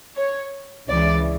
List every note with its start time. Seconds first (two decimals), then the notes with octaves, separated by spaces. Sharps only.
0.16 C#5
0.87 C#2 C#3 E3 D5